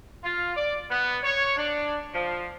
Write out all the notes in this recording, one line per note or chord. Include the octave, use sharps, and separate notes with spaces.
F4
D5
B3
C#5
D4
F3